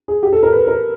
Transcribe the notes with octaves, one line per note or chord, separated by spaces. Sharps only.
G#4
G4
A4
A#4
B4
A#4